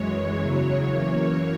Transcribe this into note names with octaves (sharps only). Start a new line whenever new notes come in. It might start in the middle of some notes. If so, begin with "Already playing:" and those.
Already playing: F#2 E3 G#3 C#5
E2 C#3 F#3
F#2 E3 A#3 C#5